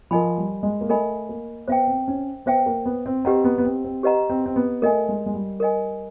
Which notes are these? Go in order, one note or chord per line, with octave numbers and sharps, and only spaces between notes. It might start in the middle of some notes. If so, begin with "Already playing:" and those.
F3 A#4 D#5 G#5 B5
G3
G#3
A#3
A3 A#4 D#5 G#5 B5
A#3
B3 C5 E5 G5
C4
C#4
B3 C5 E5 G5
A#3
B3
C4
C4 G4 B4 D#5 F#5 A#5
B3
B3
C4
C4
G4 B4 D#5 F#5 A#5
C4
C4
B3
A3 A#4 D#5 G#5
G#3
G#3
G3
A#4 D#5 G#5